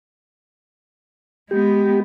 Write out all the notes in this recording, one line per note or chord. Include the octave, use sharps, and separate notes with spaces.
G#3 B3 G4